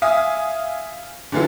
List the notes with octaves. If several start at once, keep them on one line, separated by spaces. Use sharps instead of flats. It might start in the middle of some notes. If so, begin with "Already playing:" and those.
E5 F5 G#5 D#6
D3 E3 F#3 F4 A4